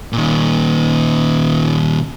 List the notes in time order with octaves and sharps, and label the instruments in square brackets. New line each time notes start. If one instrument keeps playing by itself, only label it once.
[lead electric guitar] A#2 D#3